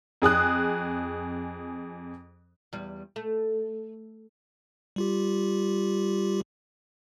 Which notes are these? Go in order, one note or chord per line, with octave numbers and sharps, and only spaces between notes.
F2 G#4 D#6 F#6
E2 G3
A3
G3 F4 G4